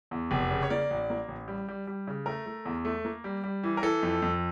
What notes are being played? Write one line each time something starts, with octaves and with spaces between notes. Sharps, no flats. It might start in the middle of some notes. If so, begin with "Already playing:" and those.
E2
F1
C#3
C#5
A#3 D5
A1
A#3
A1
G3
G3
G3
C#3
A3 A#4
A3
E2
A3
A#3
G3
G3
E3
A#4
E3 A4
F2
F2